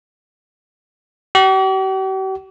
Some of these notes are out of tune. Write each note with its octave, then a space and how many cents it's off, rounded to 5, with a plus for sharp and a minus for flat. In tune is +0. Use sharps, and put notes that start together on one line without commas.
G4 -45